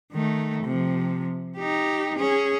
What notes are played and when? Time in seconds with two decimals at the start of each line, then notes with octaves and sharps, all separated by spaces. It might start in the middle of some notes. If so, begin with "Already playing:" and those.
0.12 D#3 A3
0.64 C3 F3
1.58 D#4 G4
2.17 C#4 G#4